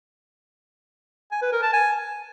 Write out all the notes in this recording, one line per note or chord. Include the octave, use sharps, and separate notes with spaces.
G#5
B4
A#4
A5
G#5